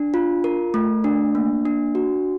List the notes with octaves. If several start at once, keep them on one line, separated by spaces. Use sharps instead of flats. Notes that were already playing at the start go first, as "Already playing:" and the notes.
Already playing: D4
F4
A#4
A3
D4
A#3
D4
F#4